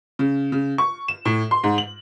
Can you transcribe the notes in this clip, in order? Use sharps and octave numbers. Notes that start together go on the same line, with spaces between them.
C#3
C#3
C#6
E7
A2
C6
G#2
F#7